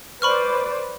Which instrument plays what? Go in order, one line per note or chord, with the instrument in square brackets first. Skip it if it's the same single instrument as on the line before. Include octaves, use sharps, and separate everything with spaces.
[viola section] B4 C5 D5 [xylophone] B5 C#6 F6